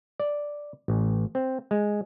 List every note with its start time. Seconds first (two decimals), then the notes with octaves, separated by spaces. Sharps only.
0.20 D5
0.88 A1
1.35 C4
1.71 G#3